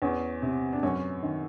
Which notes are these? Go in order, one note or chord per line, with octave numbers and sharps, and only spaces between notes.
E2 C#4
C3
D4
F#2 C#4
D#3